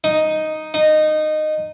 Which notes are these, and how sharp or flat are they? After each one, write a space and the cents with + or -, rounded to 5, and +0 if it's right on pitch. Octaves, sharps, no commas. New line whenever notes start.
D#4 +0
D#4 -15